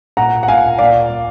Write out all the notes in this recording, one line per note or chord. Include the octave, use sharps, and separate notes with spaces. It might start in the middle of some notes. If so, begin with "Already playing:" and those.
A#2 F#5 A#5
F#5
A#2 F5 G#5
A#2 D5 F5
A#2